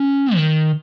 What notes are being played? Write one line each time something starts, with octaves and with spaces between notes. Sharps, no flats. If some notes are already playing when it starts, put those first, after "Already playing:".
Already playing: C#4
D#3